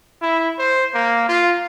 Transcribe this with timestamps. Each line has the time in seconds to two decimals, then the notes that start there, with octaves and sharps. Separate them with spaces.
0.22 E4
0.59 C5
0.94 A#3
1.29 F4